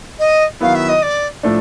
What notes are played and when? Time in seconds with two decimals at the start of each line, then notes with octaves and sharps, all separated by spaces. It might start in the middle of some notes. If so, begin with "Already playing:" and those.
0.19 D#5
0.61 D#3 F#3 B3 E4 F5
0.75 E5
0.89 D#5
1.02 D5
1.43 A2 F3 A3 D4